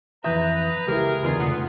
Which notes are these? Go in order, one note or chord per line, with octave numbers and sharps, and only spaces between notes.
F2 E3 B4 E5 A#5 D#6 G6
C#2 A3 E4 G4 G#4 A#4
E2 B2 D3 A#3 F4 G#4
F1 B3